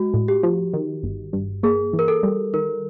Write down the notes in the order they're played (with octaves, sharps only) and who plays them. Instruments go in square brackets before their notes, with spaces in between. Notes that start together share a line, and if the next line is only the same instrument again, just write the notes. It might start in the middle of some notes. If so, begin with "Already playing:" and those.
Already playing: [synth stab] G#3 [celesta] F#4
[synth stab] A2
[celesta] G4
[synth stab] F3
D#3
G1
G2
[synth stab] A#3 [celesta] G#4
[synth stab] E3
[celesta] A#4
A4
[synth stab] G3
[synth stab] D#3 [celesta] A#4